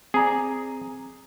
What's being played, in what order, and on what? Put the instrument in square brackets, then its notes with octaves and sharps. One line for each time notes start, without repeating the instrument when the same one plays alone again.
[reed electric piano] C4 A#5 [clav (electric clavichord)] G#4 D5